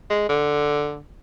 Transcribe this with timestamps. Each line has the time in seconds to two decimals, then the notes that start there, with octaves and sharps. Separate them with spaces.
0.10 G#3
0.29 D3